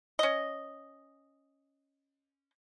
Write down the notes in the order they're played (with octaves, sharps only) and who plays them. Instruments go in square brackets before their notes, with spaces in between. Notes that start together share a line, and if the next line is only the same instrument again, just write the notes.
[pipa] C#4 D#5